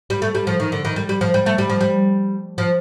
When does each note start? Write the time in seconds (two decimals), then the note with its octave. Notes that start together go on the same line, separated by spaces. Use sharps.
0.10 G3
0.22 A3
0.35 G3
0.47 F3
0.60 D#3
0.72 D3
0.85 D#3
0.96 G3
1.09 G3
1.21 F3
1.34 G3
1.46 A3
1.58 G3
1.69 F3
1.81 G3
2.58 F3